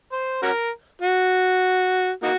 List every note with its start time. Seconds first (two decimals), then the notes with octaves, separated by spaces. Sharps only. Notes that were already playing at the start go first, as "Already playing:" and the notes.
0.12 C5
0.42 C#4 F#4 A#4
1.02 F#4
2.23 A#3 D#4 F#4